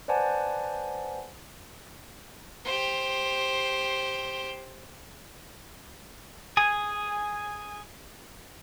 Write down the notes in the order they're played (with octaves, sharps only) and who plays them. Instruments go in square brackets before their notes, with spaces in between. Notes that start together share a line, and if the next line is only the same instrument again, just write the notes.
[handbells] B4 C5 D5 F#5 G#5 A5
[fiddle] G4 C5
[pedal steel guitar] G#4 G#5